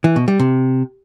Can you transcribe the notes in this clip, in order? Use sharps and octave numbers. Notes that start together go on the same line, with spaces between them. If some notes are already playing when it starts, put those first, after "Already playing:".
E3
B2
G3
C3